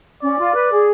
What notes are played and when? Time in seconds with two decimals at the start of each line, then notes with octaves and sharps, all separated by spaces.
0.22 C#4 D5
0.38 F4
0.55 B4
0.71 G#4